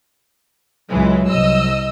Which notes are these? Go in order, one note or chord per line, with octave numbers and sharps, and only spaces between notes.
C#2 E3 F#3 G#3
C2 D#5 E6